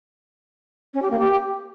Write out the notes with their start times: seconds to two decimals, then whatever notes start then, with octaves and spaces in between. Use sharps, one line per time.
0.94 C#4
1.02 G4
1.11 A#3
1.19 G4